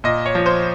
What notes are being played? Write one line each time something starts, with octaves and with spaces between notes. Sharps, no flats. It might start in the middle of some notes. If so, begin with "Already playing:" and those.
A#2 D#5
C#5
F3
C5